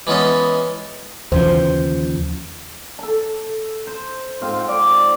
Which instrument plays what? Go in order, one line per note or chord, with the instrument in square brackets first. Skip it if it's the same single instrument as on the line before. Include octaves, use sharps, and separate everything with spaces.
[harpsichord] E3 G#3 B3 C#4 A4
[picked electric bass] D#2 C#3 F3 [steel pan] E3 C5
[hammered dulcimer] A4 A5
C5
G#2 C4 F4
D5 D6